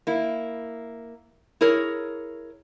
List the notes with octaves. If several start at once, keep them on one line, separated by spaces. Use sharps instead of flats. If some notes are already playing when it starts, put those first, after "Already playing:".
A#3 E4
E4 G#4 A#4 C#5